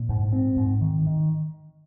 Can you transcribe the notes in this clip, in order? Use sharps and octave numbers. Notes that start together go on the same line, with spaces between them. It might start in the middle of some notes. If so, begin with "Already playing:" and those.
Already playing: A#2
G#2
C4
G#2
D#3
D#3